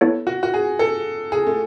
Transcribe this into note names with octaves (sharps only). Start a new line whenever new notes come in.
B3 E4 A4 C#5
F#4
F#4
G#4
A4
G#4
A3